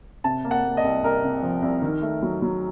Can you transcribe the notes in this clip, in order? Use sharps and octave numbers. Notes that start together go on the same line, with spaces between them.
C3 A5
A#3
F#5
A#3
D#5
C2
C2 A#4
C3
F3
C2
D#3
A3
F#3
F#3